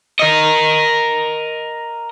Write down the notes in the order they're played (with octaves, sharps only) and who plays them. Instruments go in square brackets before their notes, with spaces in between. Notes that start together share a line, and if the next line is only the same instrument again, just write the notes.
[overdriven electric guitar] A#4 D#5